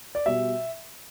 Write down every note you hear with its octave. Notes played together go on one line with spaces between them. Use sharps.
D5
B2 G3 E5